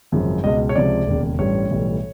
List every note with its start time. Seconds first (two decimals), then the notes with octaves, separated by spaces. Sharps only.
0.12 G#1 F#2 C#3 F3
0.44 C#2 B2 G#3 D#5
0.69 C#5
0.75 C#2 C3 F3 G#3 D5
1.07 E1 D#2 C#3
1.39 A1 G2 E3 G3 C#5
1.71 B1 A2 E3 G3